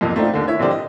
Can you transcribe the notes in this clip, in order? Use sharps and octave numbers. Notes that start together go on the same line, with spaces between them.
B1 F2 A#2
A3 A#3 C4 D4 D#4 F4
D#2 D3
E4 C#5 E5
A#1 A#2 D3 G3 C4 D5
D#5